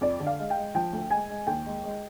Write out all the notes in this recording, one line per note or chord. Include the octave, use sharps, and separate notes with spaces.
F2 D5
D3
F5
G#3
G5
G#3
F3 G5
D2
G#3 G#5
G#3
D#2 G5
G#3
G#3